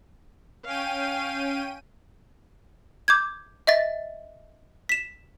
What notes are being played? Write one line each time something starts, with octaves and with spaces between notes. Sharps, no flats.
C#4 F5 G5 D#7
D6 G6 G#6
D#5 E5 A6
B6 E7